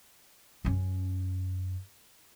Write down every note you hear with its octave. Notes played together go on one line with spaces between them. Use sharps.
F#2 C#4